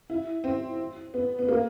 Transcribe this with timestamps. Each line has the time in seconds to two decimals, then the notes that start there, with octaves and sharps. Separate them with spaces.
0.10 E4
0.44 C4
1.14 B3
1.39 B3
1.49 A#3